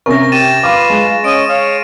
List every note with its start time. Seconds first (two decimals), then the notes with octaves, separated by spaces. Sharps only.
0.06 C3 C#4 A#4 C#6 A#6
0.32 G4 A6 D#7 E7
0.63 F4 B4 F5 D6
0.90 G#3
1.24 C#4 D#5 D7 D#7
1.49 C#5 F5